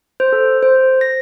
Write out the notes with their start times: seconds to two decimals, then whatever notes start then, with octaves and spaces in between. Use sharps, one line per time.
0.20 C5
0.33 A4
0.63 C5
1.01 A#6